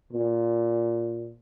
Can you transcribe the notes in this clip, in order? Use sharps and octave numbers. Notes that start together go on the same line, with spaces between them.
A#2